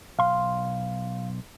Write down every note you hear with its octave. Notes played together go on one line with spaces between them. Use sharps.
B1 F5 C6